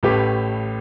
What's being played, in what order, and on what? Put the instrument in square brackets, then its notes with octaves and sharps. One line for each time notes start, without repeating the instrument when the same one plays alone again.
[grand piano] A1 A2 A3 G4 B4